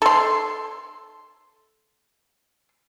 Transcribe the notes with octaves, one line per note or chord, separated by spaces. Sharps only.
A4 C6